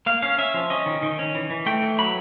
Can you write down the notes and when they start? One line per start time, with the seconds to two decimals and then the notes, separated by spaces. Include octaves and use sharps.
0.06 A#3 F5
0.22 C#4 F5
0.38 C#4 E5
0.54 F3
0.70 C#4 D#5
0.86 D#3
1.02 D#3
1.19 C#4
1.35 E3
1.50 E3
1.66 A3 G5
1.82 E3
1.98 F#3 B5